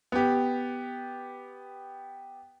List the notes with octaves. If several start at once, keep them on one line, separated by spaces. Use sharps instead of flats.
B3 G4